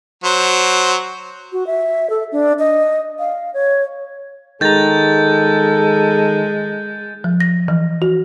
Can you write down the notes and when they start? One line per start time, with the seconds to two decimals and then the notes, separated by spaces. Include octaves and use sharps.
0.24 F#3 C5
1.52 F#4
1.67 E5
2.10 A4
2.32 D4
2.59 D#5
3.19 F5
3.54 C#5
4.61 D#3 G#3 A4 A#5 G6 A6
7.24 F3
7.40 A#6
7.68 E3
8.02 F#4